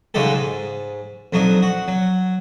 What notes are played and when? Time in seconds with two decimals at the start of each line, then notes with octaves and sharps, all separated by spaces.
0.14 C#3 F#3 G#3 D#4 G4 A4
0.32 G#2
1.33 F2 F#3 D4 D#4
1.62 F#4
1.88 F#3